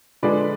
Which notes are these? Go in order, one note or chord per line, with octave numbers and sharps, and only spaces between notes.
D3 F3 G#3 B4 D5